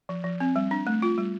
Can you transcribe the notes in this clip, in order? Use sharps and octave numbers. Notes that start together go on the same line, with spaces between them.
F3
F3
C4
G3
D4
A3
F4
G3